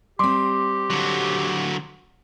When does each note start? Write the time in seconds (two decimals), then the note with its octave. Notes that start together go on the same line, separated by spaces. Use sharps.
0.19 G3 C4 G4 C6 D6
0.90 D3 F#3